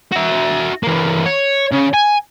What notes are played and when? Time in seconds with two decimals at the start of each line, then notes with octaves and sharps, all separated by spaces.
0.12 F#4 E5
0.83 E3 A#3
1.26 C#5
1.72 C#3
1.93 G#5